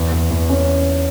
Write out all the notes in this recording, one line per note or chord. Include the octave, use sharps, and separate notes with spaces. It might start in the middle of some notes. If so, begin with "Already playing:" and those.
Already playing: E2
E2
E2
C#4